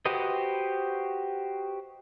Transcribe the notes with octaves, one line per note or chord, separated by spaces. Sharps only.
F#4 G4 B4 C5 D#5